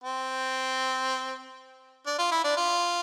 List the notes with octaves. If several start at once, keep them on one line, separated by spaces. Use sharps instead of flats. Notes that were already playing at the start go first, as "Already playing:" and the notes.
C4
D4
F4
E4
D4
F4